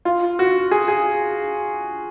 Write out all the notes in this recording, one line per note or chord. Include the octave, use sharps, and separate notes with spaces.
F4
F#4
G#4
G#4